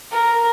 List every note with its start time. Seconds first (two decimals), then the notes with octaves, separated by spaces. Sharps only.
0.11 A#4